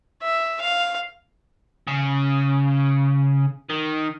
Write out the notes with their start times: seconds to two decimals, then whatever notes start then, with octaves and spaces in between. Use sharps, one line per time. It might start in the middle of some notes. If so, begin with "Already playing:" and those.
0.22 E5
0.61 F5
1.87 C#3
3.70 D#3